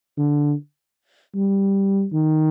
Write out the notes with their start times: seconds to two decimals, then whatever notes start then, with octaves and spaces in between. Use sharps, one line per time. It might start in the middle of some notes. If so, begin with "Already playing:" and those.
0.18 D3
1.35 G3
2.13 D#3